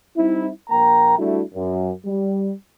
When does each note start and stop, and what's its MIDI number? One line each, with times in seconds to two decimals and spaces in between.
0.17 0.49 55
0.17 0.49 60
0.17 0.49 63
0.17 0.49 64
0.70 1.15 34
0.70 1.15 58
0.70 1.15 79
0.70 1.15 82
1.18 1.41 55
1.18 1.41 57
1.18 1.41 62
1.18 1.41 64
1.18 1.41 66
1.55 1.91 42
2.05 2.52 55